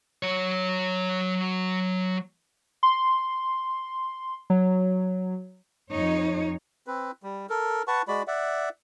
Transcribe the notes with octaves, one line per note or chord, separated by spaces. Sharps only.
F#3 C#5
C6
F#3
F2 D#4 C#5
C4 B4
G3
A4 A#4
B4 F#5 A5 C#6
G#3 F#4 D5 B5
D5 E5 F#5